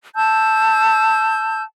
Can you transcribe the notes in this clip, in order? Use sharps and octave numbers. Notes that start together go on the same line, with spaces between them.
A5 E6 G6